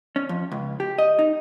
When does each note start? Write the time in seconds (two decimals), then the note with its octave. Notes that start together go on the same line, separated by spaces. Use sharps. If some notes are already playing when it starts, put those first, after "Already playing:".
0.16 C#4
0.29 F2
0.52 C#2
0.80 G4
0.98 D#5
1.19 D#4